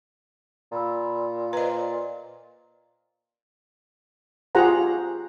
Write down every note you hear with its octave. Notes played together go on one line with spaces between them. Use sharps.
A#2 A#5 B5 E6
B4 C5 D#5 A#5
F4 G4 G#4 C5 F#5 A#5